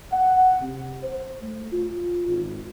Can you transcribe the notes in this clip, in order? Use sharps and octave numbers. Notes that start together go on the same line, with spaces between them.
F#5
C3
C5
A3
F4
G#1